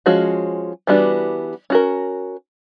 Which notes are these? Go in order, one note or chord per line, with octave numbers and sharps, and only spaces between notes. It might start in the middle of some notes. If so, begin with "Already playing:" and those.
F3 G#3 C#4 F#4
E3 G3 B3 D4 F#4
C#4 F#4 A#4